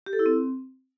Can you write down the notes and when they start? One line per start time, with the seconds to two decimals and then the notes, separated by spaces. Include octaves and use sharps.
0.06 G4
0.13 A4
0.19 E4
0.26 C4